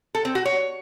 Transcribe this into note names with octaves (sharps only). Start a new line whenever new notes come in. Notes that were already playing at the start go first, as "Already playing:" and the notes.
A4
C4
F#4
C#5